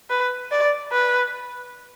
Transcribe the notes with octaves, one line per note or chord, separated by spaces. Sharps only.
B4
D5
B4